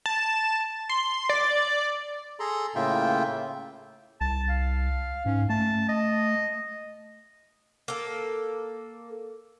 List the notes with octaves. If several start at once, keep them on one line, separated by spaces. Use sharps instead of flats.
A5
C6
D5
G#4 A4 A#5 C6
A2 C#3 A#3 F4 E5 G5
C2 A5
F5
G#2 C#4
A3 A5
D#5
A#3 A4